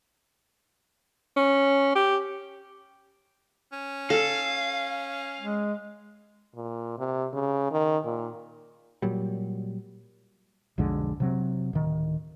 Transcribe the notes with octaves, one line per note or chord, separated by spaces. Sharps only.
C#4
G4
C#4
A4 F5
G#3
A#2
C3
C#3
D#3
A#2
A#2 F#3 G3
B1 F2 D3 G#3
C3 F#3 C4
D1 D#3